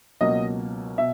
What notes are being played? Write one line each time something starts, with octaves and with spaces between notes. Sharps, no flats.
C#2 B2 F#3 A#3 D#5
B2 E5